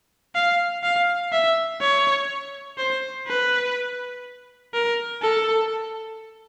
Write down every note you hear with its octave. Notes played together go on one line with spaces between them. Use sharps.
F5
F5
E5
C#5
C5
B4
A#4
A4